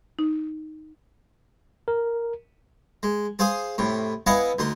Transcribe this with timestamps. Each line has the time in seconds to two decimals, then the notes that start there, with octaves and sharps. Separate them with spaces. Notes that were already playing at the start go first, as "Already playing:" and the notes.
0.19 D#4
1.88 A#4
3.03 G#3
3.39 G#4 C5 F5 C6 D#6
3.78 A2 C3
4.26 B3 E4 D#5 F5 F#5 G#5
4.59 D2 D#4 C6